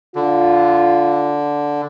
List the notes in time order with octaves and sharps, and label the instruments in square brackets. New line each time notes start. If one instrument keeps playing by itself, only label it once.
[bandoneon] D3 [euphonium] F4